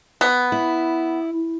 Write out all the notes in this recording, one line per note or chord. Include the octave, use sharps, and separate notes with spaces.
B3
E4